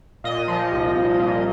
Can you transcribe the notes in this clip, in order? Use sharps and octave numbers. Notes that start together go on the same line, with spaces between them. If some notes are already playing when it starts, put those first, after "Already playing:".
A#2 D#5
F3
C2
C2
A#2